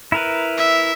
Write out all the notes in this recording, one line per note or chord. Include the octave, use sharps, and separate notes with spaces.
E4 A#4 B4
E5